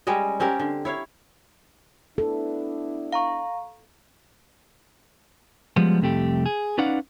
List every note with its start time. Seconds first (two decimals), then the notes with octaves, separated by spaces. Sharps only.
0.07 G3 G#3 C#4 D#5
0.40 C4 C#4 G4 A#4
0.60 D3
0.85 E4 C#5 F5
2.18 B3 D4 E4 A4
3.13 F5 A#5 C#6
5.76 F3 G3 G#3 B3
6.00 C2 F2 C3 A3 G4
6.46 G#4
6.78 C#4 D#4 B4 D5 F5 F#5